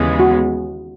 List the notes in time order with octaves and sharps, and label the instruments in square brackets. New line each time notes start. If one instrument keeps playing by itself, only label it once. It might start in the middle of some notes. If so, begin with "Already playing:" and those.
Already playing: [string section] D#2 C#3 E3 G#3 B3
[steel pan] F#4